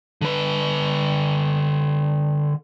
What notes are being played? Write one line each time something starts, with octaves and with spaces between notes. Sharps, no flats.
D3 B4